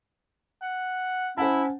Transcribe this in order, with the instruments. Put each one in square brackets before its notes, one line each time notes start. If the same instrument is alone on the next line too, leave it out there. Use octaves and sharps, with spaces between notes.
[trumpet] F#5
[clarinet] C#4 [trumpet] E4 [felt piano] C5 F#5 A5